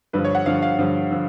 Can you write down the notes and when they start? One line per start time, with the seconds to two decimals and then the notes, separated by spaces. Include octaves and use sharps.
0.13 G2 D3 F3 B4
0.24 C#5
0.35 F#5
0.46 G2 D3 F3 F5
0.62 F5
0.79 G2 D3 F3
1.12 D3 F3